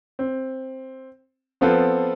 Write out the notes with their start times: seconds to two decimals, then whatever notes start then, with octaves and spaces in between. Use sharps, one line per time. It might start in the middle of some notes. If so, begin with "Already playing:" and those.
0.19 C4
1.61 F3 B3 C4 F4 A4 B4